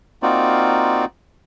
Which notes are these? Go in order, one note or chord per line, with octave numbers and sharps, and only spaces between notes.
A#3 C4 D#4 F4 F#4 D5